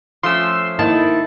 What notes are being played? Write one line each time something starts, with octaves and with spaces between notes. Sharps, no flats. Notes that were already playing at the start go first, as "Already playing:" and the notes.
F3 A3 C#4 C6 E6
D#3 A#3 E4 A5